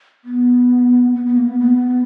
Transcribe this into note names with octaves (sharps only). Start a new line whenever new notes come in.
B3
B3
B3
A#3
B3
B3